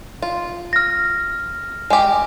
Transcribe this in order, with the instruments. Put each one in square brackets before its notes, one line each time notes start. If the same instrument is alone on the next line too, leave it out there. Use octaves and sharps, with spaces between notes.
[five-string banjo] F4
[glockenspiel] F6 A#6
[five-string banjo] G#3 G4